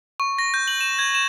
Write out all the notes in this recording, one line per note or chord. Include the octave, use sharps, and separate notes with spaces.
C#6
A#6
G6
F#7
E7
G#6
E7